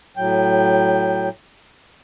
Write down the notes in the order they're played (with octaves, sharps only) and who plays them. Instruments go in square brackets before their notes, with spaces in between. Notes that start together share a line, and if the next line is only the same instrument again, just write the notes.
[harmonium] A2 F#3 G5